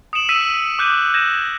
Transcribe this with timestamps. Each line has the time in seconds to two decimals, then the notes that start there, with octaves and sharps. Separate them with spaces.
0.13 D#6 C#7 D7 E7 F#7
0.29 E6 B6 D#7
0.79 D6 F#6 G6 B6 D#7
1.14 G6 G#6 A#6 D#7 E7